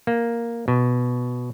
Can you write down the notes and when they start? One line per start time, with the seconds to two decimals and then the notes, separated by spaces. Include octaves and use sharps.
0.07 A#3
0.68 B2